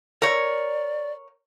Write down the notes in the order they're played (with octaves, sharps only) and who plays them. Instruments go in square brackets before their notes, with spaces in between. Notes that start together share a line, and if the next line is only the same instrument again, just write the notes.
[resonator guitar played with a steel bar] A#4 C#5 [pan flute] D5